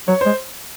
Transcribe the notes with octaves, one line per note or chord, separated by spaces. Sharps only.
F#3 C#5
G#3 C5